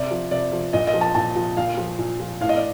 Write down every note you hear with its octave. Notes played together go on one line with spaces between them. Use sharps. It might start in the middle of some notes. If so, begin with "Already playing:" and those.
Already playing: C3 D5
F3
C3 D5
F3
A#2 D#5
D#5
F3
A5
A#2 A5
F3
A#2 F5
F3
A#2
F3
A2 F5
D#5
D5